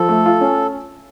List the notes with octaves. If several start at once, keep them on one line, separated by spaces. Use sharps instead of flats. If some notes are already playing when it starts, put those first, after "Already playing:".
Already playing: F3 A4
A3
F4
C#4